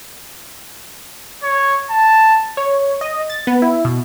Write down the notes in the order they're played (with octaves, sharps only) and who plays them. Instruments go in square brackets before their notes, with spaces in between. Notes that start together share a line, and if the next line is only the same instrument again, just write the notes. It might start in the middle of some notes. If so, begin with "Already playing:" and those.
[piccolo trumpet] C#5
A5
[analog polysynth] C#5
D#5
A6
B3
E4
B2